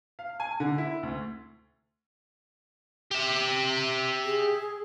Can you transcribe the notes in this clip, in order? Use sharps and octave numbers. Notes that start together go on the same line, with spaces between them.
F5
G#5
D3
E4
D2
G4 E5
G#4